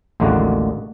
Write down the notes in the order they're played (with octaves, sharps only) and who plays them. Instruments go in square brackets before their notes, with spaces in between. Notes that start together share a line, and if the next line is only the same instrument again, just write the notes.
[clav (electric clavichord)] A1 D#2 D3 G#3 A#3 F#4